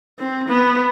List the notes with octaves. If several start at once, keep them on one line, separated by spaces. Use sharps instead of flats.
C4
B3